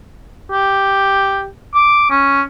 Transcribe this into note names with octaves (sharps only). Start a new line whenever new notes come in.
G4
D6
C#4